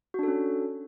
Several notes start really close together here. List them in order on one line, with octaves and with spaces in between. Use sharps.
F#4 D4 A4 C#4